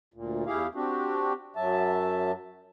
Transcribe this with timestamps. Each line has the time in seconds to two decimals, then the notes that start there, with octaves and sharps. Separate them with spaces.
0.14 D2 A#2
0.47 E2 E4 G4 G#4 F5
0.75 C4 D4 F#4 G4
1.56 F#2 F#3 E5 A5